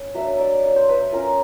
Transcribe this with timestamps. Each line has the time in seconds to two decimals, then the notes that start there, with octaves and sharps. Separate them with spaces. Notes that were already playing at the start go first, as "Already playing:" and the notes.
Already playing: C#4
0.14 F#3 A#3 D4 E5
0.39 D5
0.64 C#5
0.76 C5
0.89 B4
1.13 A#3 C#4 F4 A#4